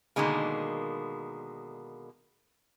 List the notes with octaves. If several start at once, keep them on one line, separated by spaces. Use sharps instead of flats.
B2 D3 D#3 G#3 A#3